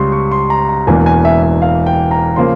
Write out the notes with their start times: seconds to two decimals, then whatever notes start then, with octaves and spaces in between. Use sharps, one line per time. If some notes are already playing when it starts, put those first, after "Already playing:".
Already playing: C#2 C#3 G3 C6 C#6
0.12 C#6
0.31 C6
0.50 A#5
0.69 A#5
0.87 E1 E2 E3 A#3 G#5
1.06 G#5
1.25 E5
1.43 E5
1.62 F5
1.87 G5
2.11 A#5
2.36 C#3 F3 A#3 C6